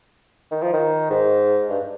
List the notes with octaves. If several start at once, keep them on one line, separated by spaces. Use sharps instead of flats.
D#3
F3
D#3
G#2
G2